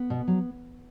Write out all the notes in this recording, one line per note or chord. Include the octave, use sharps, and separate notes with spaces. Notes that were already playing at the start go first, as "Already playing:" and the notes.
Already playing: B3
B2
F#3